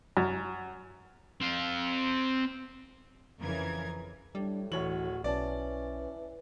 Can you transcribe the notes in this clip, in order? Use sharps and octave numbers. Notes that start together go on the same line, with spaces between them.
F#2
C4 F5
F2 C#3 E3 A#4 G#6
A2 G3 D4
D1 E3 F#4 C#5 F#7
B1 E3 C#4 D5 A5